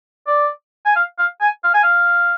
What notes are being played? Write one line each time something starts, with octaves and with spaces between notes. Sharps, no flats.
D5
G#5
F5
F5
G#5
F5
G#5
F5